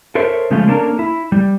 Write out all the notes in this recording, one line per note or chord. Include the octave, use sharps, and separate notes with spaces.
A4 A#4 C5 C#5 E5
C#3 F3 G#3 A3 F4
A#3 C#4 D4 A4 A#4
E4
G3